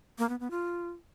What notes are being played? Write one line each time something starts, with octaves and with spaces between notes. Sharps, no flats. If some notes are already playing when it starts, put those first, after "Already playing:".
A#3
B3
B3
F4